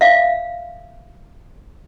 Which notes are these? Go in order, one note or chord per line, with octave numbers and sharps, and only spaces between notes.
E5 F5